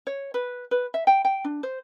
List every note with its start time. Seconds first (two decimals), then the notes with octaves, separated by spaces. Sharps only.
0.07 C#5
0.34 B4
0.71 B4
0.94 E5
1.07 G5
1.25 G5
1.44 D4
1.63 C5